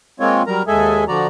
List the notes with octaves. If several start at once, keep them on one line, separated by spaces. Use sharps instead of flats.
G#3 A#3 C4 F4 C#5
F#3 G3 A#4 A#5
D#2 G#3 G#4 A4 E5 G#5
D3 F3 F#4 D5 A#5